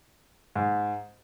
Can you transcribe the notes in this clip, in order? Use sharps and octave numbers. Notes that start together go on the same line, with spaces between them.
G#2